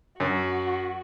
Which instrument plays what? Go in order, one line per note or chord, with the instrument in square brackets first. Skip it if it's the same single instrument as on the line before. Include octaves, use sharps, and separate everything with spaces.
[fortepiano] F#2 [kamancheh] F#4